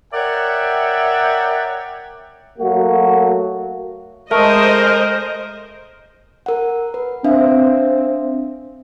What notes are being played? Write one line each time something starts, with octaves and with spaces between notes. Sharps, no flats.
A#4 C#5 D5 E5 F#5 G5
F#3 A3 A#3 F#4
G#3 A3 A#4 C5 D#5
A#4 F#5
B4
C4 D4 E5 F5